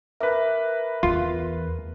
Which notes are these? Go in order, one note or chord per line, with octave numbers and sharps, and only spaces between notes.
A#4 B4 E5 D6
E2 F4